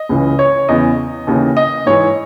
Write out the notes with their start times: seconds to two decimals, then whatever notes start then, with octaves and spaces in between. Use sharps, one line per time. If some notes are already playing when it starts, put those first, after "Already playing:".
Already playing: D#5
0.09 C#2 C#3 E3
0.39 C#5
0.69 E2 C#3 E3 D#5
1.27 D#2 C#3 E3
1.57 D#5
1.86 G#2 E3 C#5